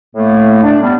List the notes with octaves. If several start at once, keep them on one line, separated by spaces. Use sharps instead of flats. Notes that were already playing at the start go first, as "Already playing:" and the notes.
A2 A3 A#3
D4
G3 B3